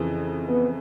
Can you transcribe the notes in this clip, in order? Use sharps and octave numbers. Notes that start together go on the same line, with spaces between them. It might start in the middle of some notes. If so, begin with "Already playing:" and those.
Already playing: F2 C#3 E3
B3